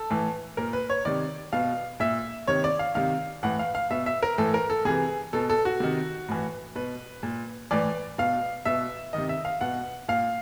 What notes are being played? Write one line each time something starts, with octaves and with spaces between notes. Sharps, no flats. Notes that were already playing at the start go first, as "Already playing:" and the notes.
Already playing: A4
A2 E3
A#2 A#4
B4
C#5
C3 D#3 D5
B2 F5
A#2 E5
C3 D#3 C#5
D5
F5
C3 D#3 F5
A2 E3 F#5
F5
F5
B2 E5
E5
A#4
A2 E3 A4
A#4
A4
C3 E3 G#4
B2 A4
A4
F#4
C3 D#3
A2 E3
B2 B4
A#2
A2 E3 D5
B2 F5
B2 E5
C3 D#3 D#5
E5
F5
B2 F#5
A#2 F5